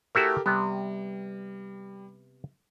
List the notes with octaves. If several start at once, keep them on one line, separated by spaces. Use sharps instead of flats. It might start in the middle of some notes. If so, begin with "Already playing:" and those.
A3 E4 F#4 G4 A4 A#4
C3 G3 B3